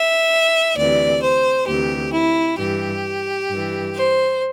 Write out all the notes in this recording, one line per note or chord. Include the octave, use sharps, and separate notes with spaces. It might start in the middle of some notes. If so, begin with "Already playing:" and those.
Already playing: E5
D2 C3 E3 D5
C5
D2 C3 E3 G4
E4
G2 E3 G4
G2 E3
C5